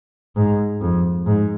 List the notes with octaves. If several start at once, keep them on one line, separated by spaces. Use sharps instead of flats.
G#2
F2
G#2